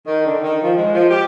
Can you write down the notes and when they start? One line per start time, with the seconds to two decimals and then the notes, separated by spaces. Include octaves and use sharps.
0.06 D#3
0.25 D3
0.42 D#3
0.62 F3
0.77 G#3
0.94 F3
1.11 G4